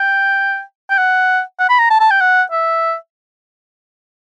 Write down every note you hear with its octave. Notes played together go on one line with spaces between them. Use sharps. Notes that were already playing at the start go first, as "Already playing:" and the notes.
Already playing: G5
G5
F#5
F#5
B5
A#5
A5
A5
G5
F#5
E5